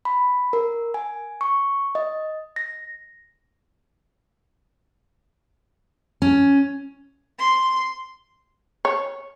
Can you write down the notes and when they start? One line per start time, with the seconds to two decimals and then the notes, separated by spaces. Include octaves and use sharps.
0.05 B5
0.53 A#4
0.94 G#5
1.41 C#6
1.95 D#5
2.56 A#6
6.22 C#4
7.39 C6
8.85 C#5